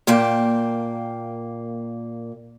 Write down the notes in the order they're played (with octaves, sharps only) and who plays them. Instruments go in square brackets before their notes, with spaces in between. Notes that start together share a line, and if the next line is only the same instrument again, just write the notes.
[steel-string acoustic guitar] A#2 A#3 G5 A5